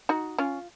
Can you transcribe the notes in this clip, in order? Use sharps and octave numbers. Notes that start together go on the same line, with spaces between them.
D#4 F#4
C#4 F4